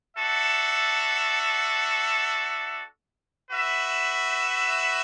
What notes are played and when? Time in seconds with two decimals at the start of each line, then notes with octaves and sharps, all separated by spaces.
0.17 D4 F#4 A4 E5
3.50 F#4 B4 E5